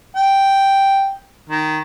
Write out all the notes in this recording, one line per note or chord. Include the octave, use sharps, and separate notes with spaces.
G5
D#3